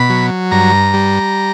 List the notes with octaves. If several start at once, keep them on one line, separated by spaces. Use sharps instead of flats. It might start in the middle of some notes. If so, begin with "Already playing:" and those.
Already playing: B2 B5
F#3
G2 A#5
G3